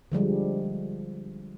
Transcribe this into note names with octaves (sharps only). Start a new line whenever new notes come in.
D3 F3 G3 G#3